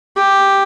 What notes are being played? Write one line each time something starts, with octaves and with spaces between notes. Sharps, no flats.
G4